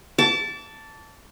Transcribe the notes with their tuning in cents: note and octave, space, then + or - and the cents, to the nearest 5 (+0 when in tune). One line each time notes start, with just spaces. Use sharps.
A5 +5 D6 -35